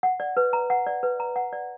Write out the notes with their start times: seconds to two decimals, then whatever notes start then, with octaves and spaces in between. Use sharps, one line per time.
0.03 F#5
0.20 D5
0.37 B4
0.53 A#5
0.70 F#5
0.87 D5
1.03 B4
1.20 A#5
1.36 F#5
1.53 D5